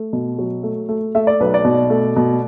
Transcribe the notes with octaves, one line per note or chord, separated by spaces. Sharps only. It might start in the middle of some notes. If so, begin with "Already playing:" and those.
Already playing: A3
B2
F#3
A3
A3
A3 E5
D5
B1 B4
D5
B2
A3
B2